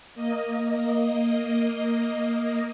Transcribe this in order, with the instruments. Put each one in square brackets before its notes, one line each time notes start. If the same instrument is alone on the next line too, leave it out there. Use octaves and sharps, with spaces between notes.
[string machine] A#3 D#5